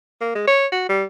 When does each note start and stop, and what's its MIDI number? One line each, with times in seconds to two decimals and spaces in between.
0.21 0.31 58
0.35 0.46 56
0.47 0.66 73
0.72 0.85 66
0.89 1.04 55